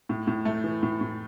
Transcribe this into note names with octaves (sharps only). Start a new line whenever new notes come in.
A2
A2
A3
E3
A2
A2